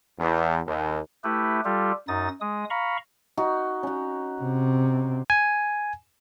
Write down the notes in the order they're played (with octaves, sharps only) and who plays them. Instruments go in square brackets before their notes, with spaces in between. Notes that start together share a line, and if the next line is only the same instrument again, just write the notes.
[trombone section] E2
D#2
[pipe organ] A3 E4 G4 B4
G3 F4 G4 A4
F#2 D#4 D#6 A6
G#3 D#6
F5 A#5 B5 C#6
[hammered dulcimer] D#4 F#4
C#4 F#4
[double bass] C3
[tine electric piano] G#5